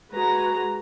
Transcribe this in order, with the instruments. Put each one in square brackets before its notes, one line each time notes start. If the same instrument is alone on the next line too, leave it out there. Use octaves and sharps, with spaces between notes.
[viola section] G#3 F#4 G#4 B4 A#5